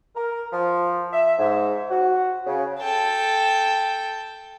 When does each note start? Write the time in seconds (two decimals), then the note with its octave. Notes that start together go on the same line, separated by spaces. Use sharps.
0.14 A#4
0.52 F3
1.12 E5
1.38 G#2
1.91 F#4
2.46 C#3
2.80 A4 G5